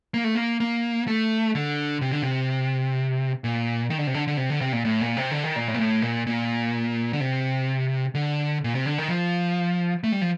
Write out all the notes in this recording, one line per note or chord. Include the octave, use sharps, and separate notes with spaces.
A#3
A3
A#3
A#3
A3
D3
C3
D3
C3
A#2
D#3
D3
C3
D3
D3
C3
D3
C3
A#2
A2
A#2
C3
D3
D#3
A#2
A2
A#2
A2
A#2
A#2
D3
C3
D3
A#2
C3
D3
D#3
F3
A3
G3
F3